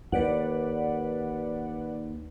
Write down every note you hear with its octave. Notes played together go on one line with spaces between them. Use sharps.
D#2 B4 D5 F#5